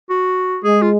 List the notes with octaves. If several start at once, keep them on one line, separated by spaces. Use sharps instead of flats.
F#4
G#3 G#4
F4